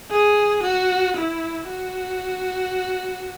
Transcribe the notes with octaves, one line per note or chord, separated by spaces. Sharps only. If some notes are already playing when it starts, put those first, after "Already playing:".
G#4
F#4
E4
F#4